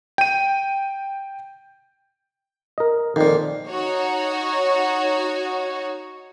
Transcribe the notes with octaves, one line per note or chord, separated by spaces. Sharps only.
G5 D#7
A#4 D#5
F2 A#2 D#3
D#4 F#4 C#5